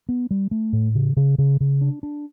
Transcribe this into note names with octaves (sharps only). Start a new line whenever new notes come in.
B3
G3
A3
A2
C#3
C#3
C#3
C#3
D4
D4